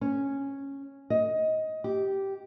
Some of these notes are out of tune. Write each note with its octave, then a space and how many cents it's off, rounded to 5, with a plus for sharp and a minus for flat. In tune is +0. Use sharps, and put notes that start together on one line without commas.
C#4 -5
D#5 +15
G4 -10